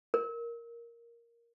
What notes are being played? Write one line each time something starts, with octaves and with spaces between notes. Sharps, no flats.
A#4